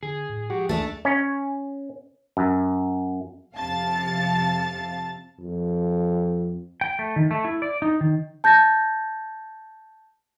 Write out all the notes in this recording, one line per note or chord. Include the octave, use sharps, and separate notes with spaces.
D3 G#4
A2
F3 G#3 F#4 G4
C#2 A3 D4 A5
C#4
F#2
F2 C3 F5 A5 A6
F2
G5
A3
D#3
A3
E4
D5
D#4
D#3
A5 G6 A6 A#6